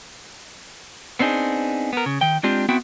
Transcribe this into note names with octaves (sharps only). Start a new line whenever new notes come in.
B3 C4 D4 D#4 G#4
B3 A#4
C#3
D#3 G5
G#3 C4 D4 F4 G4
B3 C4 E4 F#4 E5 G5